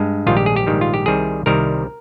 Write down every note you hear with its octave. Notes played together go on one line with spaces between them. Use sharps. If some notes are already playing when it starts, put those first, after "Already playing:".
Already playing: G2 G#3
A#1 G#2 D#3 G3 F4
G4
G#4
G4
A#1 G#2 D#3 G3
F4
G4
C2 C3 D#3 G3 G#4
C2 C3 D#3 G3 A#4